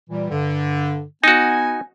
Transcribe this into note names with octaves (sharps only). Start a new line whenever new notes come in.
A#2 E3 G3
G2 D3
B3 D#4 F#4 G#5